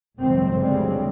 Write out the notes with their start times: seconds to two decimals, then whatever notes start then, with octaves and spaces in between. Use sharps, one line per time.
0.18 G1 C#2 F#2 B2 E3 C4
0.57 D2 C#3 F3 G3 G#3 C4